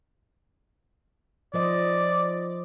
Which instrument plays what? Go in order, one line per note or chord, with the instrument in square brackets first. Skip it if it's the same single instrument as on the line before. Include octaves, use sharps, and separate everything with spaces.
[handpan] F3 C5 D#5 [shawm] D5